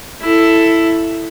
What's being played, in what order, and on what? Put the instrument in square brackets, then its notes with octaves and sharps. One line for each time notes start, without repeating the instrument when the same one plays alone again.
[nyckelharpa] E4 A4